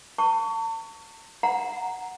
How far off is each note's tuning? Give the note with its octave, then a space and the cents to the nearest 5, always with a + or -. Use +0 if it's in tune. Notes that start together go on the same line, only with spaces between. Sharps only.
A5 +40 C#6 +25
F#5 +0 A#5 +0